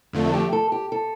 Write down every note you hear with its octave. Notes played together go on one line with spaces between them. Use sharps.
F2 D3 A3 F4
A4
G4
A4
G4
A4